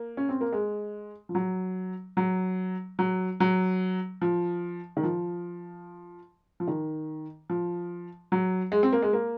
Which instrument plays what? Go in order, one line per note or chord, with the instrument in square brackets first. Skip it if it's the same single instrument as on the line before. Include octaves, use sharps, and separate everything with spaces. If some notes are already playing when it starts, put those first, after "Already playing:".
Already playing: [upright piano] A#3
C#4
C4
A#3
G#3
F3
F#3
F#3
F#3
F#3
F3
D#3
F3
F3
D#3
F3
F#3
G#3
C4
A#3
G#3
A#3